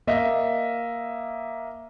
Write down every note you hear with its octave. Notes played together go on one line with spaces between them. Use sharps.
A#3 D#5 E5